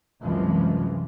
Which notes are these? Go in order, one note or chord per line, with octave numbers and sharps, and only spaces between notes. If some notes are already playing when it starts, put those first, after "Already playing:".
C2 F#2 C3 E3 F3 G#3